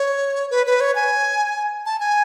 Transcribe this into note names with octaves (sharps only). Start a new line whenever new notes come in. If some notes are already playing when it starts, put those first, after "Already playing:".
Already playing: C#5
B4
B4
C#5
G#5
A5
G#5